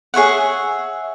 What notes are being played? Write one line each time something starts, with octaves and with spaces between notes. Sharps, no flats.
G#4 C#5 E5 F#5